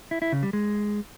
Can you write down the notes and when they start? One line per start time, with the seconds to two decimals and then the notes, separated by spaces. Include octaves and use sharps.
0.11 E4
0.22 E4
0.32 C#3
0.43 G3
0.53 G#3